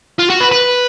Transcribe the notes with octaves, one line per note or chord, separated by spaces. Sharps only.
F4
F#4
B4
B4